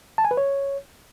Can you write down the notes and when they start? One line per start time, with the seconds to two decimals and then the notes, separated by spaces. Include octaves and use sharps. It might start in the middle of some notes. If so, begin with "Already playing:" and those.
0.18 A5
0.25 G#5
0.31 B4
0.37 C#5